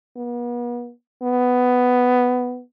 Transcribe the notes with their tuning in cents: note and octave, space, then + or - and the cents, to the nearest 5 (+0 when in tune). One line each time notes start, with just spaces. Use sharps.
B3 -40
B3 +10